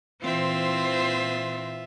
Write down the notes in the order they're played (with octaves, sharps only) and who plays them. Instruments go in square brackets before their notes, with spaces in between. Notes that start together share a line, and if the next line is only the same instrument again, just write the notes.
[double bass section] A#2 E3 [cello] C4 C5 [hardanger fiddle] F4 E5